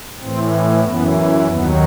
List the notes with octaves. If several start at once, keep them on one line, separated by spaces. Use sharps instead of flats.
A2 E3 C4
F#2 E3 B3
D#2 D#3 F#3 B3